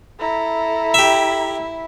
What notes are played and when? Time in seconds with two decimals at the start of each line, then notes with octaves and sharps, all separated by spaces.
0.19 E4 A4 A#5
0.94 G4 E5